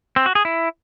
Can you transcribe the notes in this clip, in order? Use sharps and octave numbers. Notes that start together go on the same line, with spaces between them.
C4
F#4
G#4
E4